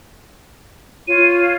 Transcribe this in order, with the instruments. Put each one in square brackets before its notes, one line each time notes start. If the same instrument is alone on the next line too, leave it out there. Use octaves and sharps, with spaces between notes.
[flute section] F4 C#5 [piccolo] D#7